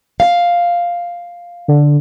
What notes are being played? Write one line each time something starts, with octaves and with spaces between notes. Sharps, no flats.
F5
D3